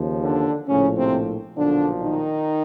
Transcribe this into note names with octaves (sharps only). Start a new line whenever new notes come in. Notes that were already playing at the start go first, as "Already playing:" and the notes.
Already playing: D#2 C#3 F3
D3 D4
A#1 A2 C#3 F3 C#4
C3 C4
B1 A#2 D3 F3 D4
D#3 D#4